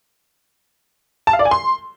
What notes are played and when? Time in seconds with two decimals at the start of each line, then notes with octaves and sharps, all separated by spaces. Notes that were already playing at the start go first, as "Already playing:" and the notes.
1.27 A5
1.33 F5
1.39 D5
1.45 G#5
1.51 C6